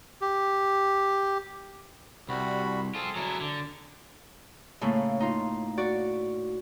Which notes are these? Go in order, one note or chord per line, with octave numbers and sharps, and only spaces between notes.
G4
C2 G3 F#4 B5
C4 F4 G#4 A4
F#3 E4
D3
A2 C#3 A3 A#3
D#4 F4
F#4 D5